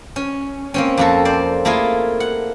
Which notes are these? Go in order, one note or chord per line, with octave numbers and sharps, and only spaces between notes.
C#4
A#3 C4 C#4
F2 A#3 A4
C5 D5
A3 A#3 E4 F4 G#4
F#5